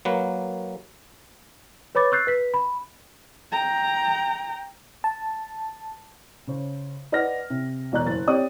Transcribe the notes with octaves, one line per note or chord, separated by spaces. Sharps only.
F#3 A#3 B4
B4 C#5 B5 D6 A6
C#6 E6 F#6 G6 A6 C7
B4 B6
B5
G5 A#5
A5
C#3 C5
B4 D5 D#5 F#5 F6 A#6
C3
E1 B2 D5 A#5 F#6
F#1 A6
C4 G4 C#5 D5 D#6